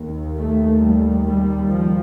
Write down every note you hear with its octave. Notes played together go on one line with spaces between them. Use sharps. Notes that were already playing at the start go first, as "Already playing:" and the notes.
Already playing: D#2
A3
G3
G3
F3